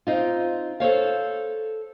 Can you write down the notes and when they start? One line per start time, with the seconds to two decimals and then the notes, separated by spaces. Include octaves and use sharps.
0.07 C4 D#4 F4
0.80 A4 C5 C#5 F5